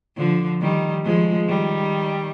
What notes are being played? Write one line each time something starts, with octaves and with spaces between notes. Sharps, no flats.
D3 F3
D#3 G3
F3 G#3
D#3 G3